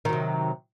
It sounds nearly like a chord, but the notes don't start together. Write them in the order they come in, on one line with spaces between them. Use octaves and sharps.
D#3 F#3 C3